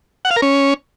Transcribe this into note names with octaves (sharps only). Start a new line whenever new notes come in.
F#5
F5
A#4
C#4